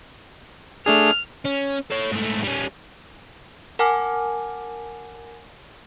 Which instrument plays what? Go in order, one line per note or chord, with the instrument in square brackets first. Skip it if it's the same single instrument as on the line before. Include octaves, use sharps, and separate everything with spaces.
[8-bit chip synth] A3 D4 G#4 [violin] F6
[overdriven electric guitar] C#4
A4 C#5
G#2 A3
G3 C#4
[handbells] A#4 F#5 G#5 A5 D6 F6